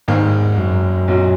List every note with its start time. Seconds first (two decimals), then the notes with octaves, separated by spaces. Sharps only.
0.08 E1 D#2 G#2 D#3 A#3
0.58 F#2
1.08 B1 A#2 F#3 C#4 F#4